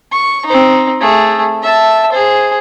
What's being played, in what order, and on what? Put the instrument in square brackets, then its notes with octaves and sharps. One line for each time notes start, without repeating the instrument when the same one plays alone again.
[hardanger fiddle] C#6
C4 D#4
A3 G#4
E5 A5
G#4 C5